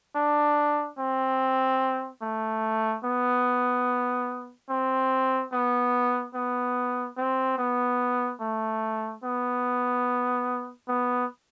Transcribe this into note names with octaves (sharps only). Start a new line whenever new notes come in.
D4
C4
A3
B3
C4
B3
B3
C4
B3
A3
B3
B3